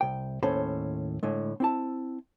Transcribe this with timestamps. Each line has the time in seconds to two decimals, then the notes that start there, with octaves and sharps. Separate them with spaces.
0.01 C2 G5
0.43 D#2 A2 C#4 A4 C5 B5
1.23 A2 D3 G#3
1.60 C4 E4 A5